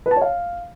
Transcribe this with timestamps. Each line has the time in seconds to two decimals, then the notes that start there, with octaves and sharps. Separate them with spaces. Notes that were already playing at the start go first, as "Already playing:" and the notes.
0.06 B4
0.11 A5
0.16 C#5
0.22 F5